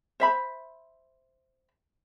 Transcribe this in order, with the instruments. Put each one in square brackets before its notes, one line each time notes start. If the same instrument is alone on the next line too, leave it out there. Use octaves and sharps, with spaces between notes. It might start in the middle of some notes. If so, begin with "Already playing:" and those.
[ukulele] C5 E5 B5